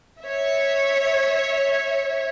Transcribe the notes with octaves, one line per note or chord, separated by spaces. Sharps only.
C#5 E5